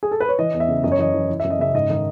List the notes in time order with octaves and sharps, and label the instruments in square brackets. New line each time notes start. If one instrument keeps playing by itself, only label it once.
[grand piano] G#4
A4
B4
C#5
E3 D#5
E2
E5
C#3
F#2 D#5
C#5
E3 D#5
E3
E3
F#2 E5
D#5
C#3 E5
G#2 D#5
D#3 D#5